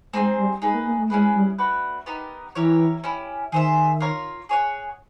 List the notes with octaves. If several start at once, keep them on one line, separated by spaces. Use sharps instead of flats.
G#3 C4 D#4 G#4 C5
G3
G#3 D#4 G#4 B4 D#5
A#3
A#3
A3
G#3 C#4 E4 G#4 B4
G3
A3 D4 F#4 B4
B3 D#4 G4 A#4
E3 E4 G4 A#4 C#5
C#4 E4 G4
D#3 G#4 C5 E5
F4 A#4 C#5 F5
G#4 C#5 F#5